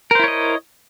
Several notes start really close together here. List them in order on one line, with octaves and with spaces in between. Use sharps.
A#4 C5 E4 C#5 D#5